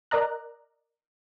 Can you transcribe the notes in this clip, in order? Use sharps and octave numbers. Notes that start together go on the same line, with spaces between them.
A#4 D5 D#5 A#5 F#6